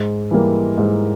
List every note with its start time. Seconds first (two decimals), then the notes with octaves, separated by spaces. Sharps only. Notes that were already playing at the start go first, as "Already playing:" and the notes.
Already playing: G#2
0.31 E3 G3 A#3
0.78 G#2